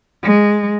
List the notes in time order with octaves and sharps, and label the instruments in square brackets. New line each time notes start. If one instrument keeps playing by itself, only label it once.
[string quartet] G#3